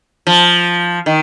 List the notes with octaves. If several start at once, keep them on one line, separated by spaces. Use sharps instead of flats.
F3
D#3